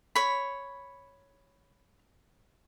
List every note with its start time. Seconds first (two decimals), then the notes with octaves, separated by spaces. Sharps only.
0.15 C#5 B5